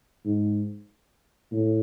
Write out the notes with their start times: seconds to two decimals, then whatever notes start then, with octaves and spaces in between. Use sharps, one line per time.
0.25 G#2
1.52 A2